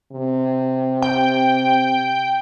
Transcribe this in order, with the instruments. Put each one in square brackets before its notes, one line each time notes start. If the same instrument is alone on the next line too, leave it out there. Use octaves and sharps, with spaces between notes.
[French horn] C3
[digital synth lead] G5